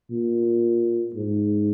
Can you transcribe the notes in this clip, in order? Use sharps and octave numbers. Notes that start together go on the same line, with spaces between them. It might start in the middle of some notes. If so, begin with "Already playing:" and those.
A#2
G#2